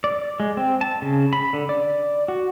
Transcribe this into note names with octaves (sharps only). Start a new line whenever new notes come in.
D5
G#3
C4
A5
C#3
B5
D3
D5
F#4